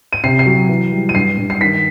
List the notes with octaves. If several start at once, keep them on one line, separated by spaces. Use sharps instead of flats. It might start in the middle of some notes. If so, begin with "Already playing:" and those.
D#7
C3 C7
C7
F#3
E3
G3
D#7
G2 C7
G2
C7
D#3 B6